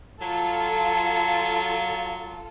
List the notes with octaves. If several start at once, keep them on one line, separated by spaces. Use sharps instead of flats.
F#3 F4 A4